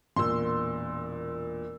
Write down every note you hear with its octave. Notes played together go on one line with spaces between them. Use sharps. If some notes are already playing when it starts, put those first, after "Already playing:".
E1 A#2 C6 E6